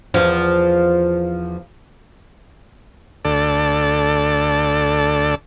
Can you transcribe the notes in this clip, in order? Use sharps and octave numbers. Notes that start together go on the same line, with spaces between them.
E2 F3
D2 A4 D5